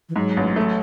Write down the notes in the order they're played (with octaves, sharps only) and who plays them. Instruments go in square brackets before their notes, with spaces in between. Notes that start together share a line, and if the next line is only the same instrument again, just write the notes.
[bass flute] E3
[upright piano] G#2 [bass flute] F#3
[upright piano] A1
A3